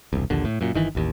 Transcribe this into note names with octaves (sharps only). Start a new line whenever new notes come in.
E1 C2
A#1 D#2 D3
A2
F#2 A#2
G1 D#3 E3
A1 D#2